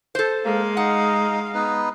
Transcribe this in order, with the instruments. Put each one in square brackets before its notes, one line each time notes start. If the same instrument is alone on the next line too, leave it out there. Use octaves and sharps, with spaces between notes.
[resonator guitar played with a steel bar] A4 C5
[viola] G#3 F5 [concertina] A#3
[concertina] D#4 [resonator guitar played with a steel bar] F#5
[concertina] B3 D#4 B4